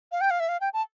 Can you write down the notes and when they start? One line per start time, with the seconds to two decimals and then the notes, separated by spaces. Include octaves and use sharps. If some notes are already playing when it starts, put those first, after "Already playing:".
0.12 F5
0.21 G5
0.30 F5
0.40 E5
0.49 F5
0.61 G5
0.73 A5